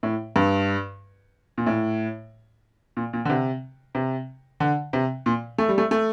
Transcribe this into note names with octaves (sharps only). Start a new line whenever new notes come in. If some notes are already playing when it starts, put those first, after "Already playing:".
A2
G2
A#2
A2
A#2
A#2
D3
C3
C3
D3
C3
A#2
A3
G3
A3
A3